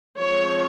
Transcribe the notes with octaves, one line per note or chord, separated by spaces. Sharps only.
F3 G#3 C4 C#5